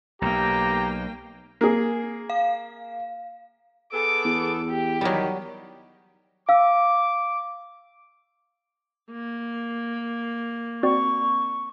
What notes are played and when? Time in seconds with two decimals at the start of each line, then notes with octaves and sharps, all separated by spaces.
0.22 B1 A#3 G4 G5 A#5
1.61 A#3 G#4
2.30 F5
3.92 B3 G#4 A4 D6
4.25 E2
4.70 G4
5.01 D#3 F#3 G3
6.49 F5 D6 E6
9.11 A#3
10.83 C4 F#4 D5 C#6